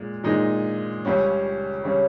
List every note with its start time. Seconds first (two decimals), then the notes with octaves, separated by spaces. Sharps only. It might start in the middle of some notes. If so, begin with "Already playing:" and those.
Already playing: A#2 G#3
0.24 A#2 G#3 D#4
1.05 C#2 C#3 G3 C#4
1.84 C#3 G3 C#4